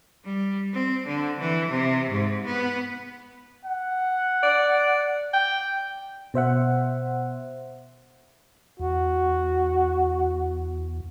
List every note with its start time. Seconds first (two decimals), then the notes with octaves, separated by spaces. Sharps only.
0.24 G3
0.74 C4
1.06 D3
1.40 E3
1.70 C3
2.11 G#2
2.45 B3
3.65 F#5
4.43 D5
5.33 G5
6.34 B2 C5 E5 F#5
8.79 E2 F#4